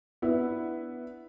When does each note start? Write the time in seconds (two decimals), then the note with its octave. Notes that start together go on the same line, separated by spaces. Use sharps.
0.22 B3 D4 E4